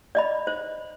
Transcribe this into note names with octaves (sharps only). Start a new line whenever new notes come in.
D5 D#5 B5
C5